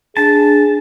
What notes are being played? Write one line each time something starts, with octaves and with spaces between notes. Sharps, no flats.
D4 G#4 A5